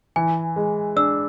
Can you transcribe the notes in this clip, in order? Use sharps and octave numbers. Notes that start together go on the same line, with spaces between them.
E3 G#5
G#3
D4 E6